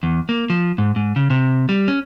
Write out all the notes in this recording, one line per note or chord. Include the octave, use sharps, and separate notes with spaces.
E2
A#3
F3
G#2
G#2
C#3
C3
G3
C#4